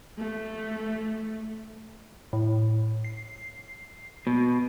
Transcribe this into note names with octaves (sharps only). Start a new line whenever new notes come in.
A3
A2
C7
B2